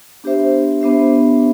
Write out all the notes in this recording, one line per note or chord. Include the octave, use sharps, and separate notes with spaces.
B3 D4 G4 C5 E5
B3 D4 G4 C5 E5